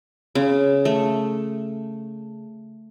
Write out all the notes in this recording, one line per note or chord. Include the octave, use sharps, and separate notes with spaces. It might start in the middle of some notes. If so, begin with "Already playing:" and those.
C#3
A3